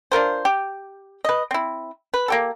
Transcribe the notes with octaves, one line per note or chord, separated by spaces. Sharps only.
D4 F4 A#4 C5
G4
B4 D#5
C4 E4
B4
A#3 G4 A4